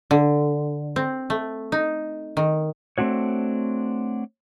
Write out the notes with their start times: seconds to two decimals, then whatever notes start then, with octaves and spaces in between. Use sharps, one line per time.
0.11 D3
0.96 C4
1.30 A3
1.72 D#4
2.37 D#3
2.98 A3 C4 D4 F#4 C#5